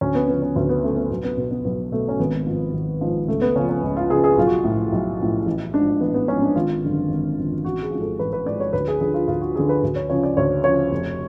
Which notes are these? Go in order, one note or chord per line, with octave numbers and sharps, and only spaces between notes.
D2 C#4
B3
C#3 F3 B3
C#4
D2 B3
B3
C#3 F3 A3
B3
B1 B3
B3
B2 B3
B3
B1 B3
B2 A3
C#4
G#1 B3
G#2 F3
G#1
G#2 F3
C#2 A3
B3
C#3 F3 C#4
C#4
C#2
F4
C#3 F3 G#4
G#4
F#4
B1 F4
F#4
A2
F3
B1
A2 F3
A1
G#2 F3 D4
A1 B3
B3
G#2 F3 C#4
D4
G#1 F4
F#2 D3 F3
G#1
F#2 D3 F3
A1 F#4
G#4
G#2 F3
A4
A1 B4
B4
G#2 F3 D5
C#5
D2 B4
G#4
D3 F3 G#4
F4
D2 F4
F#4
D3 F3 G#4
B4
D2
C#5
C#3 F3 C#5
D5
D2 C#5
C#3 F3 C#5
F1